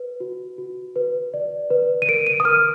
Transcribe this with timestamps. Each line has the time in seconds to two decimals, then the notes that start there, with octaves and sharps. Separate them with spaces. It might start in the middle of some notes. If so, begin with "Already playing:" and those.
Already playing: B4
0.20 F#4
0.58 F#4
0.96 B4
1.34 D5
1.71 B4
2.02 D#7
2.09 A#4 D7
2.27 D#7
2.40 D#6
2.45 A#4 F6